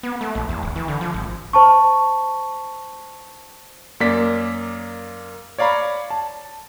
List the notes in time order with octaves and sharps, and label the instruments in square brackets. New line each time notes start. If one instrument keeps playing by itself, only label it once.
[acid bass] B3
A3
A#1
E2
D1
E3
D3
F3
G#1
[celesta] C5 A5 C#6
[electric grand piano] F#2 A#3 D5 B6
C#5 D5 F5 A#5 B5
A5